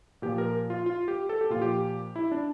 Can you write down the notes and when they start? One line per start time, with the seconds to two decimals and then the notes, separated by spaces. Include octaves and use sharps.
0.22 A#2 F3 G4
0.38 A#4
0.70 F4
0.86 F4
1.08 G4
1.29 A4
1.41 G4
1.50 A#2 F3 F4
1.62 G4
2.16 E4
2.32 D4